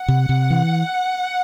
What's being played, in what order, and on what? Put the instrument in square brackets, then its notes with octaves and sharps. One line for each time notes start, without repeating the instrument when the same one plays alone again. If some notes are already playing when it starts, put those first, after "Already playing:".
Already playing: [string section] F#5
[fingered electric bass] C3
C3
E3